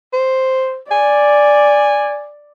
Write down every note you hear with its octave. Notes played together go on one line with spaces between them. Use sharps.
C5
D5 G#5